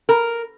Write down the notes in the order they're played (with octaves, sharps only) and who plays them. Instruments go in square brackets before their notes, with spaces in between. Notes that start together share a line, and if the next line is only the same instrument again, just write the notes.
[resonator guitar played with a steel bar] A#4